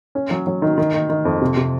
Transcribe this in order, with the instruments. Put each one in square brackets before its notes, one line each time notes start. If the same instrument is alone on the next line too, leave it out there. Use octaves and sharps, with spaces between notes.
[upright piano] C#4
F#3
F#3
D#3
D#3
D#3
D#3
F2
C3
C3